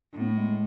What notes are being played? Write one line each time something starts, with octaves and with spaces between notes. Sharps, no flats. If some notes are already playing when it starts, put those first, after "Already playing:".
A2 D4
B3
A3
G#3